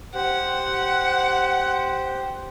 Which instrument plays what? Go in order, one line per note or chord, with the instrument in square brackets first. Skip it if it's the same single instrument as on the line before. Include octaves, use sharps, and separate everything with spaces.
[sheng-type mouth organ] G4 C5 [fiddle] F#5